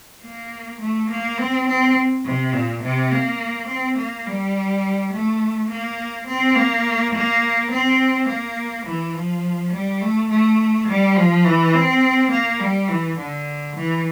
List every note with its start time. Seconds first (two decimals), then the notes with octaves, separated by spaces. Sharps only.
0.23 A#3
0.80 A3
1.10 A#3
1.38 C4
1.68 C4
2.25 C3
2.53 A#2
2.83 C3
3.12 A#3
3.68 C4
3.98 A#3
4.26 G3
5.12 A3
5.70 A#3
6.27 C4
6.56 A#3
7.14 A#3
7.71 C4
8.28 A#3
8.86 E3
9.14 F3
9.73 G3
10.02 A3
10.30 A3
10.88 G3
11.16 F3
11.45 E3
11.74 C4
12.31 A#3
12.60 G3
12.88 E3
13.17 D3
13.76 E3